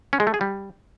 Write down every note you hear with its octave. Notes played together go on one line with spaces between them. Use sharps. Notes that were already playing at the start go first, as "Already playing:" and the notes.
C#4
G#3
A3
G#4
G3